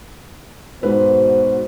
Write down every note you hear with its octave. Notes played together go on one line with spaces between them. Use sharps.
G#2 B2 F#4 B4 C5